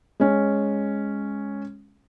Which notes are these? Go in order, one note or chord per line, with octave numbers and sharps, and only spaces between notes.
G#3 C#4